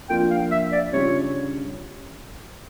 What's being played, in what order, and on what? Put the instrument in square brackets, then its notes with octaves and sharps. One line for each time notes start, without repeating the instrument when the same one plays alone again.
[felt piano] F3 A#3 D4 F4 [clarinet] G5
[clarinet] F5
E5
D5
[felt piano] C#3 G3 D4 F4 [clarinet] C#5